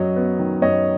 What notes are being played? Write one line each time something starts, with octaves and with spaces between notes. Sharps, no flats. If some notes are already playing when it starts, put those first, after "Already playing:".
Already playing: F#2 F#3 C#5 D#5
B3
D#3
F#2 C#5 D#5